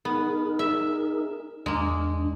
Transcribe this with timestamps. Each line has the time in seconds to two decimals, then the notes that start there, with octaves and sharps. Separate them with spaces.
0.05 B3 D#4 G#4 A#4
0.59 E5
1.66 E2 G#3 A#3 D4